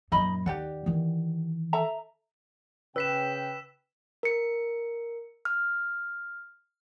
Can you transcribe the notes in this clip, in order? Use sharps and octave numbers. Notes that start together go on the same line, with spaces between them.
F#2 A#2 D#4 D#5 B5
D#2 G4 D5 F#5
D#3 E3
A4 E5 A#5
C#3 B4 G5 E6 B6 E7
A#4 C#7
F6